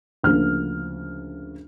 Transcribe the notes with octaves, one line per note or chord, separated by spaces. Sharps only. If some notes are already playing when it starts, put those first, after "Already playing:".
D2 C#3 F3 A#3 F6